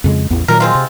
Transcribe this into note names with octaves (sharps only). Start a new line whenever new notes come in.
F2 C#3 G#3
A1 E2 B3
A#2 D#3 F#3 A#4
G#3 C4 F4
C3